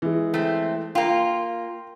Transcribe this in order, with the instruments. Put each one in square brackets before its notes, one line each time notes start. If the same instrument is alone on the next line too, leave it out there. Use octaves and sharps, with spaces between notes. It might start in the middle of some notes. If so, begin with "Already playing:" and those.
[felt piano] E3 G#3
[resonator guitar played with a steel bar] A3 C4
[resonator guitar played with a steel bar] A#3 F4 [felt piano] G5